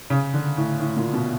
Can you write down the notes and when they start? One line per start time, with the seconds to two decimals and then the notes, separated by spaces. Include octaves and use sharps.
0.10 C#3
0.34 D3
0.57 A2
0.80 A2
0.97 A#2
1.13 B2